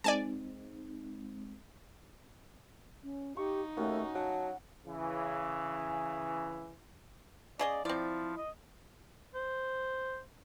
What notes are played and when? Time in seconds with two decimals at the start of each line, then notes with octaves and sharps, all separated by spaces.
0.04 G#3 C4 D#4 D5 G#5 A5
3.03 C#4
3.37 D#4 G4 C#6
3.77 D#2 A3 C#4 F#4
4.15 F#3 F#5 A5
4.85 C#3 E3
7.59 C#3 G#4 D5 D#5
7.85 F3 C4 E4 D5
8.37 D#5
9.35 C5